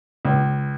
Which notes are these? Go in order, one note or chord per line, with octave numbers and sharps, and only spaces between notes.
C#2